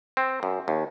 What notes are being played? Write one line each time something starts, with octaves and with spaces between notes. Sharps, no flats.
C4
F#2
D#2